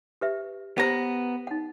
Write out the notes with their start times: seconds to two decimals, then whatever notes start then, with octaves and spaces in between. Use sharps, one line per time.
0.21 G4 B4 E5
0.78 B3 G4 B4 C5 A#5
1.47 D#4 F#5